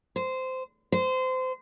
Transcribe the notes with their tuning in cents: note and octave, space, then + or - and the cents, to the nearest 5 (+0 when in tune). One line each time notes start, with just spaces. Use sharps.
C5 -15
C5 -25